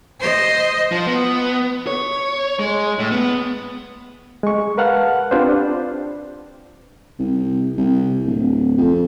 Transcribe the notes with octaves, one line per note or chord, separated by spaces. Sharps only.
C5 D#5
F3
B3
C#5
G#3
A2
B3
G#3 C#6
A#4 B4 F5 F#5 A5 F6
C4 D4 F4 G4 B4 C5
D4
C2
C2
D1
F2